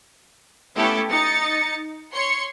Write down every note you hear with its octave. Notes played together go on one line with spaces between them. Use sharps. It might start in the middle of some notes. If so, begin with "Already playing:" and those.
A3 B3 C#4 E4 G4 A4
D#4 A6 C#7
C#5 C6 C#7